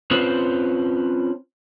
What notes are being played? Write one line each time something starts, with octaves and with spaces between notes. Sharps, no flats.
C4 C#4 F4 B4 C5